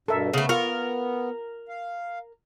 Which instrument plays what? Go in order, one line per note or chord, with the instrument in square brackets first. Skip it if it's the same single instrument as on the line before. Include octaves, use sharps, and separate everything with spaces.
[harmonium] G2 B2 [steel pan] A4 A#4 E5
[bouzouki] C#3 A3 [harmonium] B3
[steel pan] F4 C#6 [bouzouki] A#4
[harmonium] F5